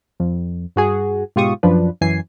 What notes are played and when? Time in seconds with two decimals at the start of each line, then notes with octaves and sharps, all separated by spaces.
0.20 F2
0.76 G2 F#4 G#4
1.36 G#2 B2 F4 G4 C#6 D#6
1.63 F#2 F3 D4 B4
2.01 F#2 E3 G#5 C7